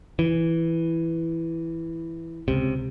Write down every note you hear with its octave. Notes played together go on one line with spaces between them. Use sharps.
E3
C#2 C3